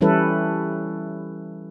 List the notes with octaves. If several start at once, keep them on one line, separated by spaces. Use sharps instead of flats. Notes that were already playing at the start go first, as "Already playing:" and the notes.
E3 G3 C#4 E4 A4 B4